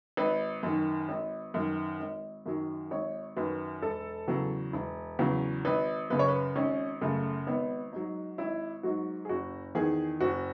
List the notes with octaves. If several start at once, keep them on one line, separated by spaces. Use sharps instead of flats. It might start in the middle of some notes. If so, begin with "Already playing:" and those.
G#1 B4
F#2 D#3
G#1
F#2 D#3
G#1
F#2 D#3 F#3
G#1 C#5
F#2 D#3 F#3 B4
E1 A4
E2 C#3 F#3
E1
E2 C#3 F#3
G#1 B4
F#2 C#3 B4
C#5
B4
G#1 C#4
F#2 C#3 A3
G#1 B3
G#2 F#3 D#4
G#1 E4
G#2 F#3 F#4
G#4
F#1 F#4
E2 D#3 G#4
F#1 F#4